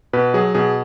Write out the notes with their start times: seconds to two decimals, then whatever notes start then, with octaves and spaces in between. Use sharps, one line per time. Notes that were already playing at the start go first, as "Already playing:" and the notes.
0.13 B2 B4
0.34 F#3 G#4
0.55 B2 G#4